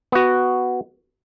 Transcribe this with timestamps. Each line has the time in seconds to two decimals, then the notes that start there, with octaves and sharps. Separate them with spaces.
0.12 B3 F#4